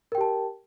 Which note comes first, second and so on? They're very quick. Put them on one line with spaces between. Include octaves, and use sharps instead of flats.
A#4 G5 G4 A5